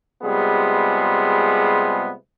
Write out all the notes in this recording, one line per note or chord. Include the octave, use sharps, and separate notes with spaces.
C3 G3 G#3 B3 F4 G#4